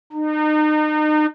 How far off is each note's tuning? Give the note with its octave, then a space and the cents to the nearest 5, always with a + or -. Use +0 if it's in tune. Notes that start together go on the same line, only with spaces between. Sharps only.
D#4 -35